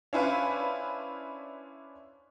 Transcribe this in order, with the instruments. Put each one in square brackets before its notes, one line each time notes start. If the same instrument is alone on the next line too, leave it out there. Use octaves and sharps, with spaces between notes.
[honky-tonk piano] C#4 D4 E4 B4 C5 F5